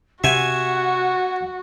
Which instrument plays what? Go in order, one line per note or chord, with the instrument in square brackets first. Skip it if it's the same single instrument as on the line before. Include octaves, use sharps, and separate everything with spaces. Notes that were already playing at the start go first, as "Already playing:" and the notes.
[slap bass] C3 [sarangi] F#4 [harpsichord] E5 G#5 [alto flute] F#5